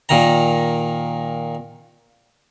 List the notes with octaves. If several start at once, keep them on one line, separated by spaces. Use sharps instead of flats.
A#2 D#3 A#5